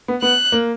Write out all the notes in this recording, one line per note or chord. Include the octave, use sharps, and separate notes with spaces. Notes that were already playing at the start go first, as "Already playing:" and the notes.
B3
B3 F#6
A#3